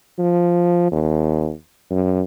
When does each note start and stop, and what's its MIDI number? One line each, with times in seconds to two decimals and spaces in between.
0.18 0.91 53
0.91 1.52 39
1.90 2.22 42